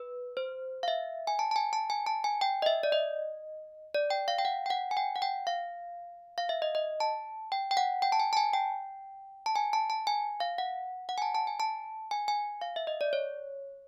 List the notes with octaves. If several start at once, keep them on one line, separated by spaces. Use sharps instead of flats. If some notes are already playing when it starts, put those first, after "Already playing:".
Already playing: B4
C5
F5
E5
G#5
A5
A5
G#5
A5
G#5
A5
G#5
G5
D#5
E5
D5
D#5
D5
G5
F5
G5
F#5
G5
F#5
G#5
G5
F#5
G5
F5
F5
E5
D#5
D#5
A5
G5
G5
F#5
G5
A5
G#5
A5
G#5
G5
A5
G#5
A5
A5
G#5
F5
F#5
F#5
G#5
A5
A5
G#5
A5
G#5
G#5
F5
E5
D#5
D5
C#5